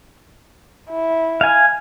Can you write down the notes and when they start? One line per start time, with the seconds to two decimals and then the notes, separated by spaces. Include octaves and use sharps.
0.90 E4
1.41 F5 G#5